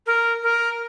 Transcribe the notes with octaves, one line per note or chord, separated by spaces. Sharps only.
A#4
A#4